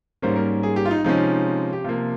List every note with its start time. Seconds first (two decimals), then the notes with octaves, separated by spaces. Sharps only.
0.22 G#2 G3 A#3 C#4 C5
0.36 A#4
0.63 G#4
0.76 G4
0.85 F4
0.91 D#4
1.04 C3 F3 G#3 C#4 D#4
1.73 G4
1.84 C3 F3 A#3 F4